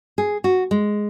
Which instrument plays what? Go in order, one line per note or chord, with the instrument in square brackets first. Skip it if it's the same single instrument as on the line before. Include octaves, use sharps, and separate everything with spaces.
[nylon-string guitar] G#4
F#4
G#3